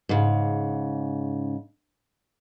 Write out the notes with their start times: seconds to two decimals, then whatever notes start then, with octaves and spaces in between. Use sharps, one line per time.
0.09 G#2 C#3